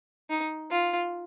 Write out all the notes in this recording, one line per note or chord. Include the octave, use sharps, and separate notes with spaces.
D#4
F4